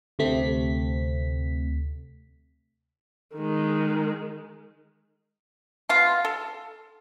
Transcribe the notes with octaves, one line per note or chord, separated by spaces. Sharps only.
D2 C3 A3 C4 B6
D#3 G#3
B2 F4 C6
A4